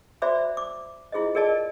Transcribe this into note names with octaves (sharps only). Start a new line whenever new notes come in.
F#4 C5 D5 E5 B5 D6
D6
E4 F4 G#4 C5 D#5
G#4 A#4 D5 D#5 A5